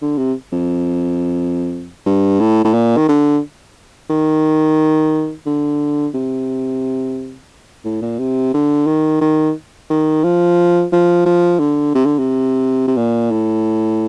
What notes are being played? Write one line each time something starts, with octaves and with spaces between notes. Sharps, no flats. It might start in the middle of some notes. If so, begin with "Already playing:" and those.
D3
C3
F2
G2
A2
A2
A#2
D#3
D3
D#3
D3
C3
A2
A#2
C3
D3
D#3
D#3
D#3
F3
F3
F3
D3
C3
D3
C3
C3
A#2
A2